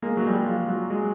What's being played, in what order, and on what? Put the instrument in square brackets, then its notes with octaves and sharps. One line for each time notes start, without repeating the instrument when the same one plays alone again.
[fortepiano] G#3 A#3
F#3 G#3
G3
F#3
F3
F#3
F#3 G#3